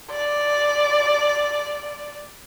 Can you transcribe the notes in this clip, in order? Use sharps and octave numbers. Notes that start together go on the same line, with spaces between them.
D5